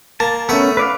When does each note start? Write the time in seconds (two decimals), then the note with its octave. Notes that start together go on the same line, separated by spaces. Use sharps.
0.20 A#3 A5
0.49 A3 B3 C#4 E5
0.77 B4 D5 F5